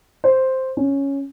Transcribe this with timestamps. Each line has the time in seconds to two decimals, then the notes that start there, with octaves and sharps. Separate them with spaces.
0.24 C5
0.77 C#4